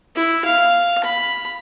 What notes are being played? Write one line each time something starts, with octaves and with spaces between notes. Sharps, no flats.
E4
F5
B5